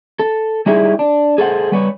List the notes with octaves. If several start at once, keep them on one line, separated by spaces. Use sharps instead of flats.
A4
G3 D#4 E4 G4 G#4
D4
G#4 A4 C5 F#5
G3 B4 C#5